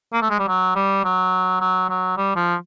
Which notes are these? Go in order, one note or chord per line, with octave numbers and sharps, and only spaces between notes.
A#3
A3
G#3
G3
F#3
G3
F#3
F#3
F#3
G3
F3